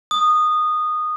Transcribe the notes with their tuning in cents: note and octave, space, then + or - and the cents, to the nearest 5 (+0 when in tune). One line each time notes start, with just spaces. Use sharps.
D#6 -15